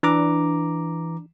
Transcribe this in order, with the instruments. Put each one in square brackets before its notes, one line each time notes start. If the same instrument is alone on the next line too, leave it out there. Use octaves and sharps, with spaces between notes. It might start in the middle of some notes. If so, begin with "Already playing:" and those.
[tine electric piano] E3 A#5 D6 [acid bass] D4